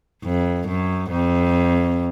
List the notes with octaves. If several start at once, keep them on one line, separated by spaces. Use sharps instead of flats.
F2
F#2
F2